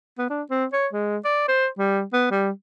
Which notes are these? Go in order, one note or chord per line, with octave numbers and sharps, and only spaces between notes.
B3
D4
C4
C#5
G#3
D5
C5
G3
B3
G3